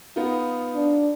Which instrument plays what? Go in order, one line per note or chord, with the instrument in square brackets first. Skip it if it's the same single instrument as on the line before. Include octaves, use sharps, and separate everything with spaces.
[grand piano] B3 D#4 F4
[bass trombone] D4